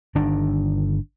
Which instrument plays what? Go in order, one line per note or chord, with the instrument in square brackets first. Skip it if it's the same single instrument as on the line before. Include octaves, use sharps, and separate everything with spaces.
[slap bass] G1 D#3 D4